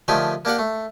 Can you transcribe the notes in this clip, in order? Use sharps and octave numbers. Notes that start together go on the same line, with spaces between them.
D3 D#3 F3 A3 G4 G#5
A#3 D4 G4 F5 F#5
A3